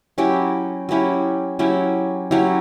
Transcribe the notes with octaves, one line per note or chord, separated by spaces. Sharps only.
F#3 C#4 E4 G4
F#3 C#4 E4 G4
F#3 C#4 E4 G4
F#3 C#4 E4 G4